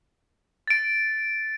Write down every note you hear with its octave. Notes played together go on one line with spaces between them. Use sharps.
A6 D7